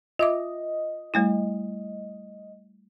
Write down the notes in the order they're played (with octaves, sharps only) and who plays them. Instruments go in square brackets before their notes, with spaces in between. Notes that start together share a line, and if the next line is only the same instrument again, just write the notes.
[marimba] F4 E5 D6 [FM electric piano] D#5
[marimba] G3 A3 E4